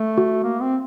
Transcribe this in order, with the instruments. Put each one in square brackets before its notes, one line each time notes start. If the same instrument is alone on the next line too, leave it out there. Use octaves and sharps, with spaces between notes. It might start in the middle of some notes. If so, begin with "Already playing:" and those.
Already playing: [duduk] A3
[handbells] F#4
[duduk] A#3
C4